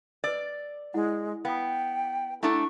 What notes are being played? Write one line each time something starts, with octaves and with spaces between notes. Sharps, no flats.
B4 D5 D#5 E6
G#3 E4 D#5 F#5
B3 F5 G5 D#6
A3 D4 E4 A4 F#5 A#5 C#6